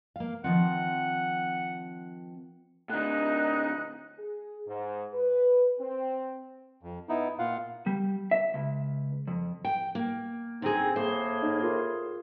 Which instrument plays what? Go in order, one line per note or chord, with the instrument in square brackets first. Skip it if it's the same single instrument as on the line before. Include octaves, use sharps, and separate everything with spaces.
[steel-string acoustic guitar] A#3 F5
[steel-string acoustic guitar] D#3 F3 C4 [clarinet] F#5
[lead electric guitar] A2 D3 [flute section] D#4 F#6
[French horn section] G#4
G#2
B4
C4
[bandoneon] F2
B3 D#4 E4
A#2 F4 F5 F#5
[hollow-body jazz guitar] G3
E5
C#2
F2
[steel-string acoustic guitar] G5
A#3
[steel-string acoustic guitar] D3 G#4 [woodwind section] C4 [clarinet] D#4
[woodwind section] A2 A#3 [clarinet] G#4 [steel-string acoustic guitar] C5
[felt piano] D#4
F4 A#4